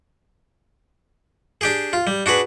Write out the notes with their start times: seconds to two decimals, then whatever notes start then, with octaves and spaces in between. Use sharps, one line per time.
1.61 D4 G4 G#4
1.93 F4
2.07 G3
2.26 D4 F#4 G#4 B4